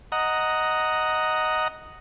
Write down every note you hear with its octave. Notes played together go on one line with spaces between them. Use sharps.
D#5 F#5 A#5